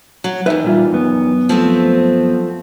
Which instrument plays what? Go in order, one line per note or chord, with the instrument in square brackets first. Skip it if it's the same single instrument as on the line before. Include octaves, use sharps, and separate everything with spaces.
[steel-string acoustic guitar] F#3
[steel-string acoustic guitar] E2 D#3 [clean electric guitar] B4 E5
[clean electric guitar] A#2 G3 F4
F#2 B3
[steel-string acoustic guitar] F3 A3 C4